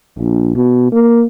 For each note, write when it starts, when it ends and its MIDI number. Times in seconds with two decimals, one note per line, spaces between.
0.19 0.51 34
0.56 0.89 47
0.92 1.25 58